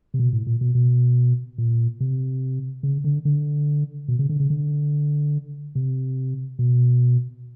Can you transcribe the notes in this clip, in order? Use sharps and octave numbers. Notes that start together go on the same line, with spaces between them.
C3
B2
A2
A#2
B2
B2
A#2
C3
C#3
D3
D3
B2
C#3
D3
C#3
D3
C3
B2